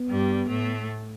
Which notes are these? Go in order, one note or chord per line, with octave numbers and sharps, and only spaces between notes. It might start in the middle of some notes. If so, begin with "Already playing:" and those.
Already playing: B3
G2 G3
A2 A3